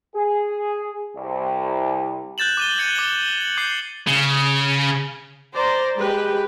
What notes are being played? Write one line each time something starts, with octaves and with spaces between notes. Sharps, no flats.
G#4
C2
F#6 G6 A6 E7 F#7
D6 D#7 G7
G#6 A6 C#7 F#7
D6 G7
F#7
D6 G6 C7
C#3
C5 D5 A#5
G#3 G4 B4